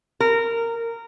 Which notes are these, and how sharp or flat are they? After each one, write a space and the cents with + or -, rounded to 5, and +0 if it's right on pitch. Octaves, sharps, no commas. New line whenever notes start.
A#4 -15